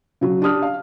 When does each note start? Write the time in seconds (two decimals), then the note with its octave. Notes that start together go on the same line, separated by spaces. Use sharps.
0.21 C#3 F#3
0.42 D4 G4 D#6 F6
0.62 F5